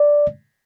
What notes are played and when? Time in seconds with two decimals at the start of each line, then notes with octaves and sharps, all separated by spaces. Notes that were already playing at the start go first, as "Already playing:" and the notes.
Already playing: D5